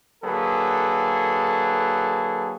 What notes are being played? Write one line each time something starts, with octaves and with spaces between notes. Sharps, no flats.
D3 F#3 A#3 G#4 A4 B4